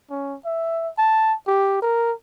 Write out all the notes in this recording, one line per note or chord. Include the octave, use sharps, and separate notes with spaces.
C#4
E5
A5
G4
A#4